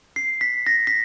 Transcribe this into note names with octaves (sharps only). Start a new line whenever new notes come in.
C7
B6
A#6
B6